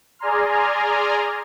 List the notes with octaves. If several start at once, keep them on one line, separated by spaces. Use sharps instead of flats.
G#4 D5 G#5 A#5 C6 F6